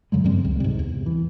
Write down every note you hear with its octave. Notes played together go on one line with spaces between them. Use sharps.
F2 C#3 F#3 G#3
G2 D#3 G3 C4
C#2
G#2 C3
E2
E3